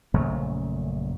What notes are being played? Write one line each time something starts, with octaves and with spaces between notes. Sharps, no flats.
A#1 F#2 C#3 A3